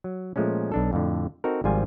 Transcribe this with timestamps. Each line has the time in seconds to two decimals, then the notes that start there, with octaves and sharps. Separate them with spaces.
0.04 F#3
0.36 A#2 F3 G#3 A3 C#4
0.72 B1 D4 A4
0.93 F2 A2 D3
1.44 C4 D#4 F#4 A4 A#4
1.64 G#1 G#2 F3 G3 F4 G#5